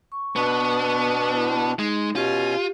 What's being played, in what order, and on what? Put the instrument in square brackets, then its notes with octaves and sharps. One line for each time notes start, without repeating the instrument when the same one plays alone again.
[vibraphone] C#6
[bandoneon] B2 D4 [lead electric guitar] B3 [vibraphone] C#6
[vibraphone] E4 A5
[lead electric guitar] G#3 [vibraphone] D#4
[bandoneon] B2 C#4 G#5 [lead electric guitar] F4 [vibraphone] G4